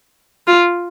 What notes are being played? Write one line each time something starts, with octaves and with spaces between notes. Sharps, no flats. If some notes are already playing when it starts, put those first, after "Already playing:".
F4